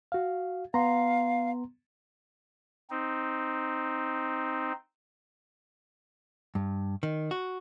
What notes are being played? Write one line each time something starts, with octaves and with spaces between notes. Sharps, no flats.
F#4 F5
B3 F5 A#5 C6
C4 D#4
G2
D#3
F#4